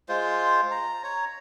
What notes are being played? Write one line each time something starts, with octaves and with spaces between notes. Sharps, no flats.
G#3 F4 C5
A#5
C#5 A#5